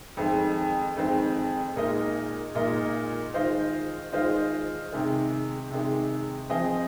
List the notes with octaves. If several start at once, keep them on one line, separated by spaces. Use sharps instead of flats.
F2 D#3 G#3 C4
F2 D#3 G#3 C4
A#2 G#3 D#4 A#4 D#5
A#2 G#3 D#4 A#4 D#5
D#3 G#3 F4 C5 D#5
D#3 G#3 F4 C5 D#5
C3 D#3 G#3
C3 D#3 G#3
F3 C4 G#4 D#5